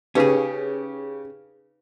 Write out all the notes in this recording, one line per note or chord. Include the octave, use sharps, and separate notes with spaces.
C#3 C#4 D#4 G4 G#4 B4 F5